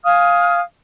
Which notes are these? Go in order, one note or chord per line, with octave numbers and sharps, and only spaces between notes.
F5 G#5 D#6 F6